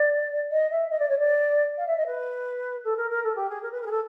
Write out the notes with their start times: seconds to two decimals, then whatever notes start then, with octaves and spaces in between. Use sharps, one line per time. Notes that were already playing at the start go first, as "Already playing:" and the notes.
Already playing: D5
0.51 D#5
0.71 E5
0.90 D#5
0.99 D5
1.09 C#5
1.19 D5
1.77 F5
1.87 E5
1.97 D#5
2.06 B4
2.84 A4
2.97 A#4
3.10 A#4
3.23 A4
3.35 G4
3.49 G#4
3.62 A#4
3.72 B4
3.81 A#4
3.86 G#4
3.91 A4